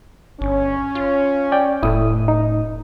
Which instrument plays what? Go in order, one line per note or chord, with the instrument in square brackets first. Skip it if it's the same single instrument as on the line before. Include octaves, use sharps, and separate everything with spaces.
[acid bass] G1 [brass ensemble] C#4
[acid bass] F4
[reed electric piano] D5 G5
[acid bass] F1 [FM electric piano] A2 D#6 [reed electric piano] A3 E4
[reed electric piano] D#4